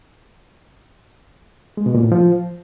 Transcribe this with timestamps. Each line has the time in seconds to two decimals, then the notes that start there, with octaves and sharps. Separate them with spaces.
1.77 G#3
1.86 B2
1.95 A#2
2.03 A2
2.12 F3